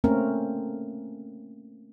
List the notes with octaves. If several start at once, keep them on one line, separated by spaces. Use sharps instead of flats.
A3 A#3 C4 C#4 A#4